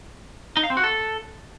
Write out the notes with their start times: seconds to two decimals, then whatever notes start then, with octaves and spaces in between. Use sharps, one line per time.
0.57 D#4
0.63 F5
0.70 C4
0.77 F#4
0.84 A4